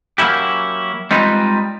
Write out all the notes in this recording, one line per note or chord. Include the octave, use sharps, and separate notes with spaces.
F#3 A#3 C#4 E4 G4
G3 G#3 C4 D#4 F4 B4